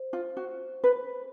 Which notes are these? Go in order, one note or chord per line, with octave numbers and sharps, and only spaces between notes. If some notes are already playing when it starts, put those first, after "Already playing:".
Already playing: C5
F4
F#4
B4